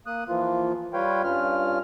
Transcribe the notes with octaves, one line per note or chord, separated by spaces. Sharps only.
A#3 D#6 F#6
E3 F3 A#3 F4
G3 F4 B4 C#5 F5 G5
G2 C#4 F4 F6